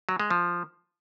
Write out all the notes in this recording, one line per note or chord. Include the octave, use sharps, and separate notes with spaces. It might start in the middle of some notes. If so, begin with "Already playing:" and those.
F#3
G#3
F3